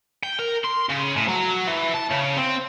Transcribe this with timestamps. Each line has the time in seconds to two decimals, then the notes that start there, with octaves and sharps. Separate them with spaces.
0.23 G5
0.39 A#4
0.65 C6
0.90 C#3
1.16 A2
1.28 F#3
1.67 E3
1.95 A5
2.11 C#3
2.38 C4